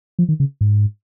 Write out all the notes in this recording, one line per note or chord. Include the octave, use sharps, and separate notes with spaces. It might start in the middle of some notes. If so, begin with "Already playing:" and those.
F3
D#3
C#3
G#2